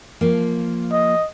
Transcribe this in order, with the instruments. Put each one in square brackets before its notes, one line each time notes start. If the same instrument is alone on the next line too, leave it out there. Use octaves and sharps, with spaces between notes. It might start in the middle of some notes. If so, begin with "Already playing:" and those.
[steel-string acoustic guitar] F3 A#3
[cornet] D#5